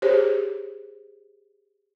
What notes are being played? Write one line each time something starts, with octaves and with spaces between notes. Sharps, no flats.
G4 G#4 C5 C#5